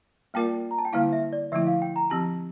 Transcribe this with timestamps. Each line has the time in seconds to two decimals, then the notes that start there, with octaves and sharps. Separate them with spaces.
0.34 G3 A#3 F4 A#4 D5 G5
0.71 A#5
0.78 A5
0.85 G5
0.93 D3 G3 A#3 E4 F5
1.13 E5
1.33 D5
1.52 D3 F3 A3 E4 E5
1.67 F5
1.82 G5
1.96 A#5
2.10 F3 C4 G4 A5